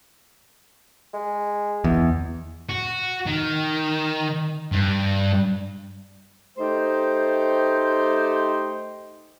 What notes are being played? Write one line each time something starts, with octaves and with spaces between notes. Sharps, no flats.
G#3
E2
F#4
D#3
G2
A3 D#4 G4 C5